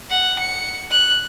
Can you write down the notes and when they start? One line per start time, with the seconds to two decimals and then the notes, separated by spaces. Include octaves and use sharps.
0.10 F#5
0.40 C#7
0.91 F#6